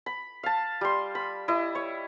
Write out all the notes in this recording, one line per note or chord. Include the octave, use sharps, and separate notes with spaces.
B5
F5 A5
G3 C6
B5
E4 D#5
C#5